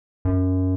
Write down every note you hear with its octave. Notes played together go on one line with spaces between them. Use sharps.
F#2